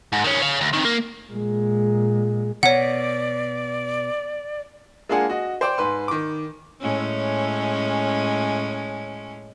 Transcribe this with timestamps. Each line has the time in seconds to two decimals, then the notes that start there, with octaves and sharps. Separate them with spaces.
0.13 G#2
0.24 D#3 C#4
0.42 C#5 F5
0.61 D2
0.73 C3 D#3
0.85 A#3
1.30 A#2 G#3
2.63 B2 C#5 D5 F#5
5.09 G#3 A#3 D4 F4 G#4 F#5
5.30 F#4 D#5
5.61 C5 D5 G5 D6
5.78 G#2 B4 C6
6.08 D#3 D6
6.81 A2 G#3 C#4